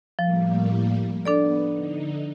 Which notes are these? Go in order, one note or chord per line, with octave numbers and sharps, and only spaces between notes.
A2 F3 G3 A#3
B3 D4 A4 D5
D3 D#4